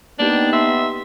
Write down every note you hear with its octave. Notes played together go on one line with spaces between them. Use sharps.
A#3 B3 D4 D#4 G4
E5 A5 C6